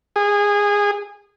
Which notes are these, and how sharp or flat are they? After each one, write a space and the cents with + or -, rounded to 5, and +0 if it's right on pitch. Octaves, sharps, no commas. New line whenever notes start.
G#4 -20